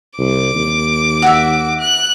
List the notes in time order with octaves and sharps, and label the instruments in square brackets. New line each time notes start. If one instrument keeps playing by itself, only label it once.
[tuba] C2 [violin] D6
[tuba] D#2
[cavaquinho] F#4 E5
[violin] F#6